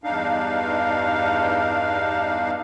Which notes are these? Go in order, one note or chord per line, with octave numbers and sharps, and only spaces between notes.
E2 G2 D4 D#4 F5